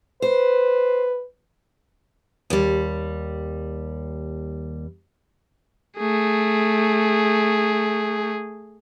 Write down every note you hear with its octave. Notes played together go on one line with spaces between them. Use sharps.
B4 C5
D#2 G3
A3 G#4